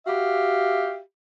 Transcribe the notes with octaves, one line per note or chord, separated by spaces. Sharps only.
F#4 G4 E5 F5